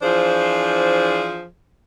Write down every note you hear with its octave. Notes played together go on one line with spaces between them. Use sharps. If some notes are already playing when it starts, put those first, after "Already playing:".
E3 F3 D4 F4 G#4 C5